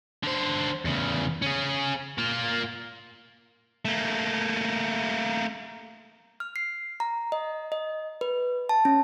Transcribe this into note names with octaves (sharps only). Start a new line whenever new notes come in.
D3 C5
E2 C#3
C#4 G#4
A#3 F4
A3 A#3
F6
C7
A#5
D#5
D#5
B4
A5
C#4